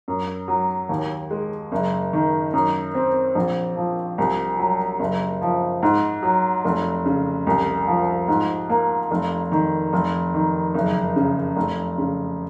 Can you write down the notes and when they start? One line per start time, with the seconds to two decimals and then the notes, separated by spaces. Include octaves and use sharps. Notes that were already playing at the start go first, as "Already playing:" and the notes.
0.08 F#2
0.48 F#3
0.89 D#2
1.30 G#3
1.72 F#1
2.13 D#3
2.53 F#2
2.95 C4
3.35 A#1
3.76 F3
4.18 C2
4.59 F#3
4.99 F#1
5.42 F3
5.82 G#2
6.23 F#3
6.64 F1
7.06 C#3
7.47 C2
7.87 F3
8.28 G#2
8.70 A#3
9.11 F1
9.52 D#3
9.93 F1
10.34 D#3
10.74 F#1
11.16 C#3
11.56 F1
11.98 C#3